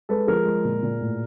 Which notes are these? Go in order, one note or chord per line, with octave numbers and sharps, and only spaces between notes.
G#3 A4 B4
F3 G#4 A#4
G#3
A#2
A#2
A2